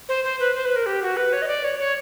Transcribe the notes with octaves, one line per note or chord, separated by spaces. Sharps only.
C5
C5
B4
C5
B4
A#4
G4
F#4
B4
C#5
D#5
D5
C#5
C#5